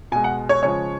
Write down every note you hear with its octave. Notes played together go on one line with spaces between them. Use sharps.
B2 G#3 G#5
F#5
C#5
C#3 F3 G#3 C#5